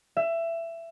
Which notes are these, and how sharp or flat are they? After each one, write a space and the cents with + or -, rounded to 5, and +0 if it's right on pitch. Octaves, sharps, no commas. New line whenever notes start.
E5 +20